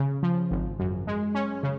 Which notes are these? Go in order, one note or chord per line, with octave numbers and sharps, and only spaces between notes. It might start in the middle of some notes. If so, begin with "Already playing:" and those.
Already playing: C#3
F3
G#1
F#2
G#3
C#4
C#3